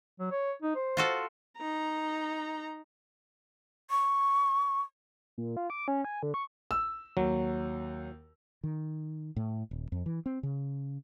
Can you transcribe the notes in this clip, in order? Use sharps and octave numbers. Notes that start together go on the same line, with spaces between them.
F#3
C#5
D#4
C5
F4 F#4 A4
D#4 A#5
C#6
A#2
F4
D6
C#4
G#5
D3
C#6
E6
D#2 F#3
D#3
A2
D#1
F2
E3
C4
C#3